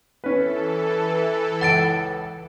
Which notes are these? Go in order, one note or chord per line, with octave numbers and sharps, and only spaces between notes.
E3 C#4 A4 B4
C#2 F#5 A6 D7